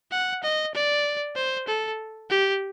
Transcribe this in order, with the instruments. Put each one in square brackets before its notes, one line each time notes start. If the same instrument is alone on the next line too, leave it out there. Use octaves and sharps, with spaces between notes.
[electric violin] F#5
D#5
D5
C5
A4
G4